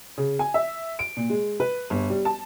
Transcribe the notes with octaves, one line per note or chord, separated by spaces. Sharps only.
C#3
G#5
E5
D7
A#2
G#3
B4
G1
G3
A5